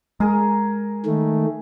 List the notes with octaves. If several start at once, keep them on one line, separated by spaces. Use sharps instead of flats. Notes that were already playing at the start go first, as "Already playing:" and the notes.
G#3 G#4 A#4
D#3 A3